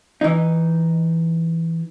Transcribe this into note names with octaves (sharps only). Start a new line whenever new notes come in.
E3 D#4